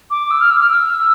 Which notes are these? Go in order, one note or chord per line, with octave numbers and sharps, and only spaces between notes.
D6
E6
F6
E6
F6
E6